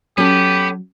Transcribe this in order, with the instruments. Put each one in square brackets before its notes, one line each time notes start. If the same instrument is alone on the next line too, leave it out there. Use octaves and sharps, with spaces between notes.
[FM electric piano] F#3 [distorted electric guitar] B3 [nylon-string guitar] C#4 A4 [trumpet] G4